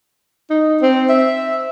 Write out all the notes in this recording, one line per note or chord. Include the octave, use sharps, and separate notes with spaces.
D#4
C4
E5